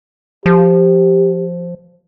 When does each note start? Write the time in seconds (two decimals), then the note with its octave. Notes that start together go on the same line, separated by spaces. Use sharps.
0.46 F3 G4